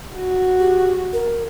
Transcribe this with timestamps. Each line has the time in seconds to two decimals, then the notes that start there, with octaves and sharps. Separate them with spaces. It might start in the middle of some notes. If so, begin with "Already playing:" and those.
0.15 F#4
0.60 G4
1.13 A#4